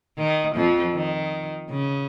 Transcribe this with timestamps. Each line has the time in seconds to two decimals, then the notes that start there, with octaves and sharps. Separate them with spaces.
0.18 D#3
0.55 F2 F3
0.94 D#3
1.70 C#3